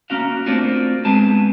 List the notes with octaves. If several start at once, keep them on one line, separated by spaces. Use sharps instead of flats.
A#3 C#4 F#4 F5
A3 A#3 C4 D4 F4 F#4
G#3 B3 C4 G#4 A5